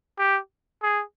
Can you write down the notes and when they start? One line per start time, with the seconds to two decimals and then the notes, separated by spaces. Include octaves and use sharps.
0.19 G4
0.83 G#4